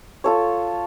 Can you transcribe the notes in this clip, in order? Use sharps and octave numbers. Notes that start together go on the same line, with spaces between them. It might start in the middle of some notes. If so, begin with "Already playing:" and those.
F4 A4 C#5